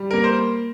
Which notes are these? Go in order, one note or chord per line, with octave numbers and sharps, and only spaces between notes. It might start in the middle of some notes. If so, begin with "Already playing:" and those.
Already playing: G3
A#3 A#4
C5